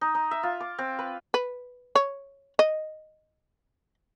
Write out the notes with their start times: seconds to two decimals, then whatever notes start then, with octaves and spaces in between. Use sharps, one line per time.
0.01 D#4
0.15 D#4
0.31 E5
0.43 F4
0.60 D6
0.78 C4
0.99 B4
1.34 B4
1.95 C#5
2.59 D#5